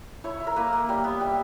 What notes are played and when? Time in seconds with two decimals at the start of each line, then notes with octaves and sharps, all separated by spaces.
0.24 E4 C#5
0.40 E4
0.47 A#4
0.56 A#3 B4
0.73 A#3
0.89 G3
1.04 B3
1.21 G3